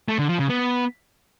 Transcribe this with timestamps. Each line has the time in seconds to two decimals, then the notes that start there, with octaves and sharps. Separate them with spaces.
0.08 A3
0.19 D3
0.29 F3
0.39 C#3
0.49 B3